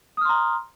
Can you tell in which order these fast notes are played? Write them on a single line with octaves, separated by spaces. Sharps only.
D#6 F6 C6 A#5